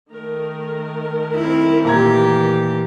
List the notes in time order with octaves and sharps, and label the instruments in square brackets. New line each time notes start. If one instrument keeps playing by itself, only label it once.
[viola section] D#3 A3 A#4
[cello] C4 E4
[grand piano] A#2 A#5 G#6 [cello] E3 G4